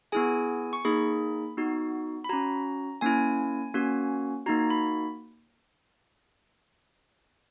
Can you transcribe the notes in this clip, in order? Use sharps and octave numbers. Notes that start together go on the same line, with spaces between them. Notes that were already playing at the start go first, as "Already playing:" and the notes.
B3 E4 G#4 G#5
C#6
A#3 D#4 G#4 B5
B3 D#4 F#4
B5
C#4 F#4 A#5
A#3 C#4 E4 G#5
A#3 C#4 F#4
A#3 D#4 F#4 A#5
B5